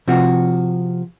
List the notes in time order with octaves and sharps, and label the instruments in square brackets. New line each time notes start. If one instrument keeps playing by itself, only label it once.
[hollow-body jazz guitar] C3 F3 F#4